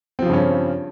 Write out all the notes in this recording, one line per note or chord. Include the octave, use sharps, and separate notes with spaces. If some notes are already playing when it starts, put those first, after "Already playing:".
G2 C#3 F3 C4 C#4